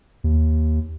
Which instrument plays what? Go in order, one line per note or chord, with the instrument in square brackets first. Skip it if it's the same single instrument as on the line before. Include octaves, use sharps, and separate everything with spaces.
[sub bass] D#2